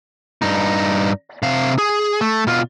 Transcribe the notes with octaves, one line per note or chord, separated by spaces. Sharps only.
G2 D#4
C3 F5
G#4
A3
B2 F4